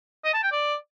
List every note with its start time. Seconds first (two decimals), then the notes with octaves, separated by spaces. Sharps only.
0.25 D#5
0.34 A5
0.43 G5
0.52 D5